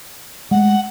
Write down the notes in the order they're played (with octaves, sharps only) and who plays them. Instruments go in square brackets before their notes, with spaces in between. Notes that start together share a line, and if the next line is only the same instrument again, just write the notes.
[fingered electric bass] G#3 A3 [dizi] F#5